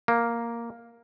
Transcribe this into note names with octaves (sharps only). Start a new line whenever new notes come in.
A#3